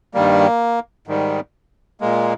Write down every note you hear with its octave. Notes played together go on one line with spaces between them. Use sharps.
G2 D#3 G3 A#3
G#2 D#3 G3
A#2 G#3 A#3